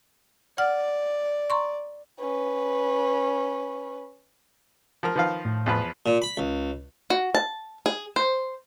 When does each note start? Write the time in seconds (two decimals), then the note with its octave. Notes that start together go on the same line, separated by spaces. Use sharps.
0.58 D5 F#5 F6
1.50 A#5 C6 C#6
2.20 C#4 B4
5.03 F3 A#4 F6
5.16 D#3 F3 B4 F5
5.45 A2
5.66 E2 F3 B4
6.06 A#2
6.22 B5
6.37 C#2
7.10 F#4
7.35 A5
7.86 G#4
8.16 C5